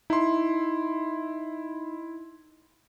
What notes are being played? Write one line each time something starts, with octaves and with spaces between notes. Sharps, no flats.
D#4 E4 C6